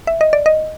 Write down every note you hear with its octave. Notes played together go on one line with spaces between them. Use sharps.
E5
D#5
D5
D#5